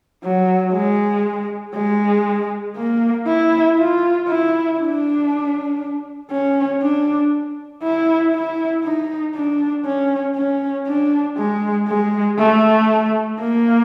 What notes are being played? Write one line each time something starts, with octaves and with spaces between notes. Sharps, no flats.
F#3
G#3
G#3
A#3
E4
F4
E4
D4
C#4
D4
E4
E4
D#4
D4
C#4
C#4
D4
G#3
G#3
A3
A#3